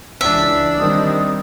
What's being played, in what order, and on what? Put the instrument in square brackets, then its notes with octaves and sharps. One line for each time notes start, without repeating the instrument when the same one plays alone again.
[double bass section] C#2 E3 [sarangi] D4 [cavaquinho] E5
[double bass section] D#3 G3 C4 [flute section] D#5 D#6